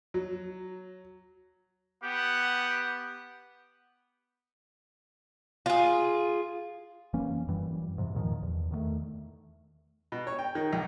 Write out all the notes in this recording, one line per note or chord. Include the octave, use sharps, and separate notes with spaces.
F#3
B3 G4 F#5
F4 G#4
F1 E3 A#3 C#4
F#2 E3 G3
G#2 C3 E3
E2 A#2 D#3 F3
E2
E2 D#3 F#3 A3
B2
C#5
G5
D#3
B1